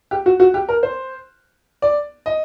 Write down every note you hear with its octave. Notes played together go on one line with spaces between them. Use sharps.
G4
F#4
F#4
G4
A#4
C5
D5
D#5